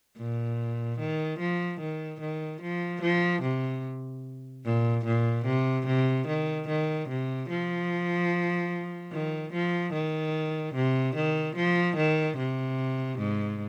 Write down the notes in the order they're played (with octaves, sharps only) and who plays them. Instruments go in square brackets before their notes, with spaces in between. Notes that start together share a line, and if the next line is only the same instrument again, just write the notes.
[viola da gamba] A#2
D#3
F3
D#3
D#3
F3
F3
C3
A#2
A#2
C3
C3
D#3
D#3
C3
F3
D#3
F3
D#3
C3
D#3
F3
D#3
C3
G#2